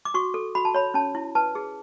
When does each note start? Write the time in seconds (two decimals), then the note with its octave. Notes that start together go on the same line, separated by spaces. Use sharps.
0.05 D6
0.14 F#4 C#6
0.34 A4
0.55 F#4 B5
0.65 A5
0.74 C#5 B5
0.94 C#4 A5
1.15 E4
1.35 B4 A5
1.55 G#4